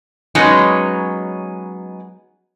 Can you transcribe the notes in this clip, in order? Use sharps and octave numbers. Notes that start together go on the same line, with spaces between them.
F#3 G#3 B3 C#4 D#4